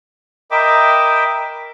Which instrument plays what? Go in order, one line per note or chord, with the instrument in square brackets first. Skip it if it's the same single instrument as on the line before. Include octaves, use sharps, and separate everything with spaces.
[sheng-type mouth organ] A#4 D#5 E5 G5 B5 D6